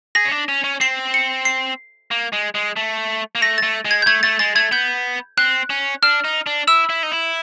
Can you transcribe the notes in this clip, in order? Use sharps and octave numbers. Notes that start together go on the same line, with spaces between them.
G#4 A#6
C#4
D4
C#4
C#4
C4 C7
C#7
C7
A#3
G#3
G#3
A3
A#3
A3 A#6
A6
A3
G#3
G#6
G6
A3 G#6
A3 A6
G#3 A6
A3 G#6
B3 G6
C4 F#6
C#4
D4 F6
D#4
D4
E4 E6
E4
D#4
E4